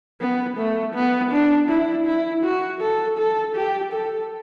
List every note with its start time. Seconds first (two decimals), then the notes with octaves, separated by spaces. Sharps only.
0.20 B3
0.57 A3
0.95 B3
1.32 D4
1.69 E4
2.06 E4
2.44 F#4
2.81 A4
3.18 A4
3.55 G4
3.93 A4